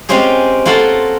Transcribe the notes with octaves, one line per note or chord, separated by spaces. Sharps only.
G#3 C4 C#4 F4 G4 G#4
A#3 F4 F#4 A4 C6